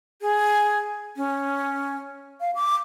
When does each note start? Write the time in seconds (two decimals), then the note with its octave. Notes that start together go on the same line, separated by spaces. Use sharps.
0.21 G#4
1.16 C#4
2.41 F5
2.55 D6